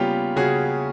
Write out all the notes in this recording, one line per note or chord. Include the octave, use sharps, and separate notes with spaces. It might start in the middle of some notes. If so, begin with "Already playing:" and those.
Already playing: C#3 G3 A#3 B3 C#4 F4 G4
C#3 F#4 G#4